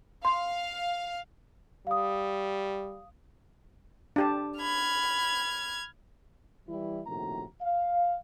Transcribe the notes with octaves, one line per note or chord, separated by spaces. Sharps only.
F5 C6
G3 F5 D#6
D4 G4 A5
B5 F6 G#6
E3 G3 E4
A#1 A2 C3 D#3 F#4 A#5
F5